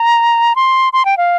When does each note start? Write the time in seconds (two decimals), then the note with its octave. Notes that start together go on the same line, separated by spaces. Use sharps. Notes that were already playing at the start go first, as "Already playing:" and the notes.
Already playing: A#5
0.56 C6
0.93 C6
1.05 G5
1.17 F5